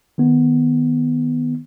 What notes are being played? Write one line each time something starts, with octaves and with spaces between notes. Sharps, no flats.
D#3 B3